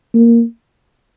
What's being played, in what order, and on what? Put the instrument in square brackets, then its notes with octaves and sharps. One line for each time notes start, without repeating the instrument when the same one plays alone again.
[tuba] A#3